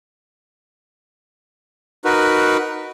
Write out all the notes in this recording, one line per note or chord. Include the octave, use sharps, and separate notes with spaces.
D#4 F#4 A#4 B4